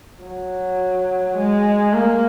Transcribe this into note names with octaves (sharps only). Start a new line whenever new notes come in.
F#3
G#3
A#3